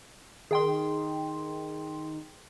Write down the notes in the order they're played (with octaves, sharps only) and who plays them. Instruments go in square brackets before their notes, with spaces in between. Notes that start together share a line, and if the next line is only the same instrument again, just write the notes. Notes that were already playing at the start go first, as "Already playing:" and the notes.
[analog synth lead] D#3 [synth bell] G#4 G5 C6